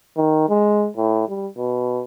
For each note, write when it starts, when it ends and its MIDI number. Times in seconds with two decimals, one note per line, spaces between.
0.17 0.46 51
0.49 0.89 56
0.97 1.25 45
1.28 1.47 55
1.57 2.03 47